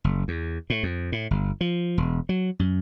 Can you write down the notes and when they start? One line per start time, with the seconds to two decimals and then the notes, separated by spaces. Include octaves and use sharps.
0.04 F#1
0.28 E2
0.70 A2
0.83 F2
1.12 A2
1.31 G1
1.61 F3
1.98 E1
2.29 F#3
2.59 F#2